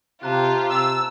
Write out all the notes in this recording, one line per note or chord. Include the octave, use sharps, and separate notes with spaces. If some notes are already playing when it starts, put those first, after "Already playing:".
C3 F4 G4 A5 A#5 F#6
C3 E6